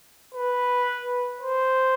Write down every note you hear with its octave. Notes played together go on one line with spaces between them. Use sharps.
B4
C5